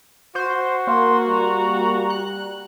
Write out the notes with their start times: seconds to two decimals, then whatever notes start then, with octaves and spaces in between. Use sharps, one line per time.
0.35 F#4 C5
0.87 A#3 C6
1.28 G3 A#5
2.10 F#6